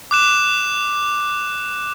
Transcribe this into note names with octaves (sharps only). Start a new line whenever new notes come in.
D6 F#6 E7